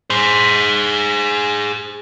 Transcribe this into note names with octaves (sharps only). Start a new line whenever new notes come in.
G#4 C5